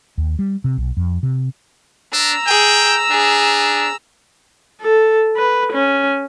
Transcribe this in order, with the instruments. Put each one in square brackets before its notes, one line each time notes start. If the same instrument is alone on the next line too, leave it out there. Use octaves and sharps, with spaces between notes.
[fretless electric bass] D#2
G3
C3
B1
F2
C3
[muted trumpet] D4 [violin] A#5 E6
[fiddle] G#4 [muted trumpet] G5
[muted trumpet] D4 [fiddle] G#4
[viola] A4
B4
C#4